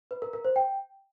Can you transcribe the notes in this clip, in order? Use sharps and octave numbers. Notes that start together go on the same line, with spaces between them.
B4
A#4
A#4
C5
G5